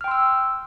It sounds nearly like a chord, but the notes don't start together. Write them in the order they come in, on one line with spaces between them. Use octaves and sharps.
F6 G5 C6 E6